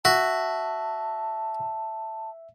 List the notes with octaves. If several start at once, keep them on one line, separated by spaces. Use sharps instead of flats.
F#4 E5 A5